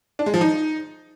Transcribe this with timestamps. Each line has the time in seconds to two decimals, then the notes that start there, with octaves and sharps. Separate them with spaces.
0.19 D4
0.26 G#3
0.34 F3
0.41 D#4